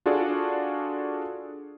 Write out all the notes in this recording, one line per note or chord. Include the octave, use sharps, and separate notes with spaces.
D4 F4 F#4 G#4 A4 D5